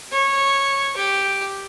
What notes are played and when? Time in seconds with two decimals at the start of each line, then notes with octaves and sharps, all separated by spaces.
0.12 C#5
0.97 G4